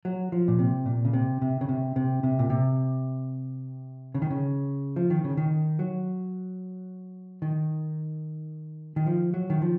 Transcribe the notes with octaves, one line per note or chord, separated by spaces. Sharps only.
F#3
F3
A#2
C3
A#2
C#3
C3
C3
C#3
C3
C3
C3
A#2
C3
C#3
D#3
C#3
F3
D#3
C#3
D#3
F#3
D#3
D#3
F3
F#3
D#3
F3